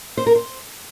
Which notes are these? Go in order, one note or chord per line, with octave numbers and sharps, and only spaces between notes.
C5
A#4
C5